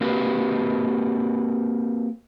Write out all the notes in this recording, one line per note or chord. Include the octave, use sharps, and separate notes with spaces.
A#3 C4 F#4 G4 B4